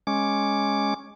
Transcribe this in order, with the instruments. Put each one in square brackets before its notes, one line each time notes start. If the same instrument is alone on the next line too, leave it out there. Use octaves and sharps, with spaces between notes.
[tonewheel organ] G#3 C#4 D6